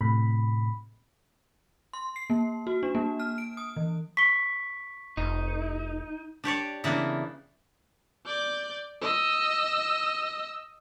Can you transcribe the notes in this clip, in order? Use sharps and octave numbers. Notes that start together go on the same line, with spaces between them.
A2 C3 B5
C6
C7
A#3
F#4
D4
A#3
F6
D7
D#6
E3
C#6 B6 G7
F1 D#4
D4 G4 C#5 D5
C#3 E3 A#3 B3 D4
D5 G6
D#5 E6